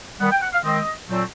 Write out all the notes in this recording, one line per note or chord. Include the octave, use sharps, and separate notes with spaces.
D#3 G3 B3 F#5
G5
F#5
F5
D#3 G#3 C4 D#5
A#2 F#3 A3 C4